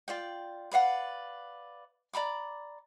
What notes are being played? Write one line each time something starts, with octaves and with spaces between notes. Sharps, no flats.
F4 D5 G5
B4 D5 F5 F#5
D5 A#5 B5 D6